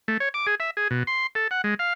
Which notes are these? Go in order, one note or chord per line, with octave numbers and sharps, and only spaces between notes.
A3
C#5
D6
G#4
E5
G#4
B2
C6
A4
F#5
G#3
F5